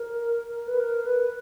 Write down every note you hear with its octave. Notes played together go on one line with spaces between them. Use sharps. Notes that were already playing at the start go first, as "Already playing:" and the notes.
Already playing: A#4
B4
A#4
B4